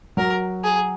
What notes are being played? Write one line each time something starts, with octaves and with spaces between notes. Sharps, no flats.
F#3 A#4
G#4